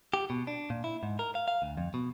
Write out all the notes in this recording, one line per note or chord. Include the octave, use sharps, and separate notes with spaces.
G4
B2
D4
A#2
E4
G#2
A#4
F5
F5
D2
F2
B2